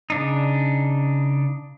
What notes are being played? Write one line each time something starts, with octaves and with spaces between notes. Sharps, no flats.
C#3 D4 D#4